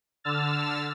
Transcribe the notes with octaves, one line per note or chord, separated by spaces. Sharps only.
D3 E6 F6 A6